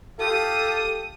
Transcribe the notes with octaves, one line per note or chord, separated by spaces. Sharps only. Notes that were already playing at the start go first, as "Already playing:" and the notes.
F4 G4 A4 D#6